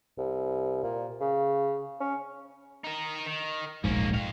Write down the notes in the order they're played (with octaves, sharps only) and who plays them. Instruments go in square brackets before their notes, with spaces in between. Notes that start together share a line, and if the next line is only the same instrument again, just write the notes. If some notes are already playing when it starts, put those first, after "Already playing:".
[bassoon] C2
A#2
C#3
C#4
[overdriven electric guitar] D#4 A#4
D#3
[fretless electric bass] D1 A#1 G#2 [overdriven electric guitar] A#3 C#4
[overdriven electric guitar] F2 F5